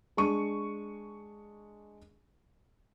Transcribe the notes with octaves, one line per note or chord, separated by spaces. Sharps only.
G#3 D4 C#6 D#7